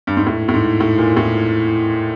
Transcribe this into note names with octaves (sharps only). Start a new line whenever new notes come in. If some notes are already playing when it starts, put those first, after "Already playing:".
G2
G#2
A2
A2
G#2
A2
A#2
A2